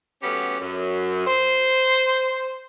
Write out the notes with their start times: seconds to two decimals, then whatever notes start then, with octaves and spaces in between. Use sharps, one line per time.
0.23 F#3 A3 B3 C#4 G4
0.60 F#2
1.26 C5